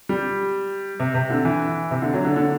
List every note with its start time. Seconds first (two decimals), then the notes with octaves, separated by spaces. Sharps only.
0.09 G3
1.00 C3
1.14 C3
1.30 D3
1.45 E3
1.91 C3
2.02 D3
2.14 F#3
2.25 D3
2.36 D3